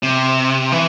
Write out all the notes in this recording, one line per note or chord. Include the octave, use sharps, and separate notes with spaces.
C3
E3